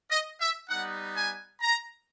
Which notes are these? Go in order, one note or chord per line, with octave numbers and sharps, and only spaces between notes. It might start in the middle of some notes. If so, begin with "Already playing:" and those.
D#5
E5
G3 B3 D#4 F#5
G#5
A#5